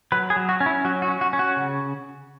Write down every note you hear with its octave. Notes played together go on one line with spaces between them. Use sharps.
F#3 B4
G#4
F#3
F#4
C#4
E4
F#3 F#4
F#4
C#4
F#4
C#4
F#4
C#3